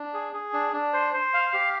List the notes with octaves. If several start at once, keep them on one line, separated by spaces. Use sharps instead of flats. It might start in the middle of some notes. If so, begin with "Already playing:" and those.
Already playing: D4
G#4
G#4
D4
D4
C5
C5
F5
G4